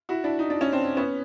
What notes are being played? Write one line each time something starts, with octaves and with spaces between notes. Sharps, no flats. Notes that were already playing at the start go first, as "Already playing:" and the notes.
E4 F#4
D4 E4
D#4
D4
C#4
C4 D4
B3 C#4